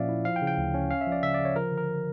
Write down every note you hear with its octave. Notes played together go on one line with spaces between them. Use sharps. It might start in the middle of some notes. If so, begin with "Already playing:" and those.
Already playing: A#2 F3 C#4 D5 E5 F5
E4
F3 F5
G5
C#3
G5
D2
C#4
C#4 F5
E5
F3
D5
C#3 E5
C#3 D5
C#5
F3 A#4
D3
A#4